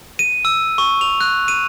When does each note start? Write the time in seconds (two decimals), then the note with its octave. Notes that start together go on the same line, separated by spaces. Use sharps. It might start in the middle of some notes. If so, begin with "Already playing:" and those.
0.19 D#7
0.45 E6
0.78 C#6
1.01 F7
1.21 F#6
1.48 D#7